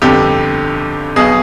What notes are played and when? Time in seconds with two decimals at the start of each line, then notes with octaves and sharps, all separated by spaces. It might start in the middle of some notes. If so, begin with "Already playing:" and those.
0.02 G1 F2 D3 G4
1.16 B1 B2 G#4